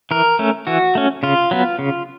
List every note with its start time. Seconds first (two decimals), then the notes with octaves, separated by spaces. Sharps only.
0.11 E3 A#4
0.39 A3 C#4
0.67 E3 F#4
0.95 A3 C#4
1.23 C#3 F4
1.51 F#3 B3
1.79 C#3